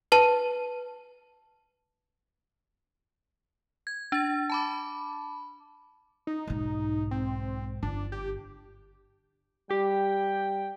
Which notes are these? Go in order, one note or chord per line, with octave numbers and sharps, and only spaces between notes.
B4 A5
G#6
D4 A6
A5 B5 D6
D#4
B1 G#2
C4
G1 D4
G4
G3 G4 G5